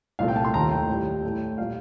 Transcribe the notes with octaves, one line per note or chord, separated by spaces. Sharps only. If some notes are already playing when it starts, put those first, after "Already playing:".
C2 A#2 A3 F5
G5
A5
C6
D#2 D#3 A3 A#5
G5
A2 G3
A2 A3
A#2 G3 F5